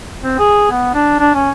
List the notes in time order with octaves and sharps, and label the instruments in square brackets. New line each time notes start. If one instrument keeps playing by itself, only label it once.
[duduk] C4
G#4
B3
D4
D4
C#4